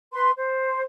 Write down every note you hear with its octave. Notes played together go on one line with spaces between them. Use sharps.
B4 C6
C5